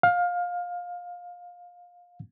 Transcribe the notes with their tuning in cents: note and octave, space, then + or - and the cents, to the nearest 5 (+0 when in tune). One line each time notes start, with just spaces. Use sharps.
F5 +20